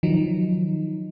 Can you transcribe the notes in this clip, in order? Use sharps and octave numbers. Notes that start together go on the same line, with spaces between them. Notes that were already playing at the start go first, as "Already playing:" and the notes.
D#3 F3 F#3 D#4